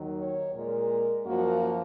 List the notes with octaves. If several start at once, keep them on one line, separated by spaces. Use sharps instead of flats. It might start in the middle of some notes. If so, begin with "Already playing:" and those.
Already playing: D#2 D#3 F#3
C#5
A#2 G#3 A#4
F#2 F3 A#3 F#4